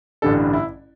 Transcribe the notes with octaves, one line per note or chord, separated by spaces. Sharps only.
A1 G2 D3 G3 A4
E4